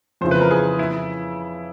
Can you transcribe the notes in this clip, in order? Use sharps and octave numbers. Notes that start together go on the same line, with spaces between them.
F2 C#3 E3 C5
B4
A#4
G#4
E4